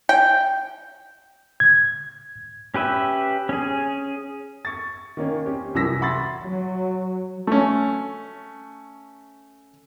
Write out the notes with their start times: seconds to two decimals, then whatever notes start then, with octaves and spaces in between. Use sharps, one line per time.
0.09 G5
1.60 G#6
2.74 C#4 G4 B4 E5
3.49 C#4 G#4
4.65 C#6 A6
5.17 D#3 A#3 C#4
5.45 C4 C#4 G4
5.74 C2 F#2 E3 E6 A#6 B6
6.01 E5 F#5 B5 C6 A6
6.44 F#3
7.47 A3 C#4